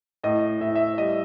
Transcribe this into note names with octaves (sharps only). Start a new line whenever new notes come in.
A2 D#5
A2 E5
E5
G3 D#5